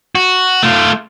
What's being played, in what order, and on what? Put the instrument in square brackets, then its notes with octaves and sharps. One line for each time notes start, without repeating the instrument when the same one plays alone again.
[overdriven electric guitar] F#4
A3 F4